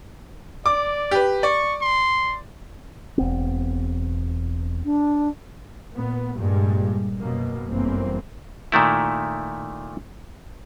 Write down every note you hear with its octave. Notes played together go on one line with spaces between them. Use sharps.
D5 D6
G4 B4
D5 C#6
C6
E1 B3 C4
D4
A#2 B3
G2 A#2 G3 G#3
F#2 B2 A#3
G1 F#2 E3 A#3 C4
A#2 D#3 A3 E4